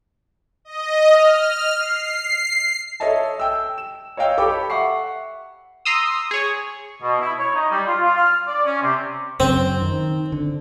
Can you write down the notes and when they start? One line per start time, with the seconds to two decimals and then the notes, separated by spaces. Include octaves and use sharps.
0.65 D#5
1.10 F6
1.78 C7
3.00 A4 C#5 D#5 E5 A5
3.40 G5 E6
3.78 E7
4.17 C#5 D#5 F5 G5 E6
4.38 G4 A4 C#5 G5 B5 D6
4.70 E5 F#5 C#6 C7
5.85 A#5 C6 D#6 E6
6.31 G#4 C#5
7.02 B2
7.21 E4
7.39 C#5
7.54 D#4
7.71 G3
7.86 F4
8.03 F4
8.17 F6
8.47 D5
8.66 C#4
8.82 C3
9.40 F#2 C#3 C4
9.81 D#3
10.32 D3